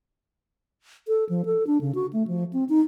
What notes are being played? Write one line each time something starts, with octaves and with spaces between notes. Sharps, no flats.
A4
F3
A4
D4
C#3
F#4
A3
F3
C4
D#4